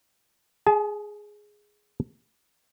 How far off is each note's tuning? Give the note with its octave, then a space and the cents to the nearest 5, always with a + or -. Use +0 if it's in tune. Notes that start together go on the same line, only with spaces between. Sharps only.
G#4 +0 A5 -45